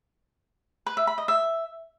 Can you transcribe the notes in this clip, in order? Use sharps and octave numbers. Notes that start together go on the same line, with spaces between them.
B4
E5
B5
D#5
E5